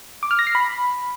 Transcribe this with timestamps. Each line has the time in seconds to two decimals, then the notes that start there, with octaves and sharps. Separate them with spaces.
0.23 D6
0.31 F6
0.39 A#6
0.47 C7
0.55 B5